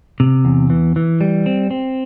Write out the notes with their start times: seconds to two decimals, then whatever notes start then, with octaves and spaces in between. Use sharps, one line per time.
0.20 C3
0.45 E2
0.70 E3
0.96 E3
1.21 G3
1.46 C4
1.71 C4